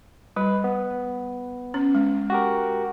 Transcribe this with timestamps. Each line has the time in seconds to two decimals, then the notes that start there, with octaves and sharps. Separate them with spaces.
0.36 G3 B4
0.64 B3
1.74 C#4
1.95 G#3
2.30 F#4 G4 A#4